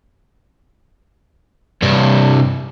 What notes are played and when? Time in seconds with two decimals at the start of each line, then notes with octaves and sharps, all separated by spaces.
1.82 G2 C3